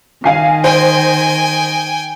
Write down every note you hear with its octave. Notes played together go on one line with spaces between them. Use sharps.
D#3 F5 G#5 C7
C5 G5 G#5